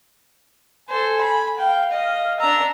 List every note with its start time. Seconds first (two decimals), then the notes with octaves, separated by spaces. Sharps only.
0.89 A4 C5 G#5
1.21 B5
1.58 F5 G5
1.91 D#5
2.40 D4 A#5 E6